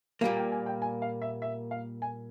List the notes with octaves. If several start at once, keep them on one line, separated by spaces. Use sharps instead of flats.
A#2 G3 A#3 F5
G5
G#5
G5
G#5
F5
E5
E5
F5
G#5